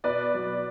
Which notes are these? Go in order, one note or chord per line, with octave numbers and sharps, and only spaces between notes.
B2 B4 D5
F#3